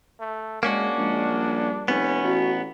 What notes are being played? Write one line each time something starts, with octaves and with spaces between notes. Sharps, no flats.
A3
G#3 A#3 C#4 D4 F#4
A#1 G#3
G3
F1 B3 C#4
A1 F#4